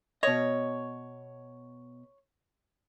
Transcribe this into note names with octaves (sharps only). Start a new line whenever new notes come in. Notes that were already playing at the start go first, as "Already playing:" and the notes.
B2 C#5 D#5